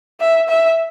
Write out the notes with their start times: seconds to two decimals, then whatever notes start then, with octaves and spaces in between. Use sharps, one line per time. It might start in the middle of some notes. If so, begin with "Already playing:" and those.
0.20 E5
0.49 E5